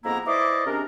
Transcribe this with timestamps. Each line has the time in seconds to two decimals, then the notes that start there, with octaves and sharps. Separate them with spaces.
0.04 F2 G#2 A#3 B3 E4 A#5
0.27 E4 B4 C5 D5 D#5 D6
0.66 C3 G#3 C#4 D4 A#4